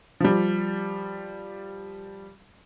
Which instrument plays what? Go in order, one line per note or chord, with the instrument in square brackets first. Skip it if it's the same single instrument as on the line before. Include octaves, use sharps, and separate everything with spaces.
[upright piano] F3 G3